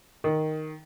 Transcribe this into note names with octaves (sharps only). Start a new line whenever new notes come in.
D#3